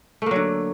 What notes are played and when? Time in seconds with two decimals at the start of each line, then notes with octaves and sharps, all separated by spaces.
0.22 A3
0.26 A#3
0.31 F#3
0.36 D3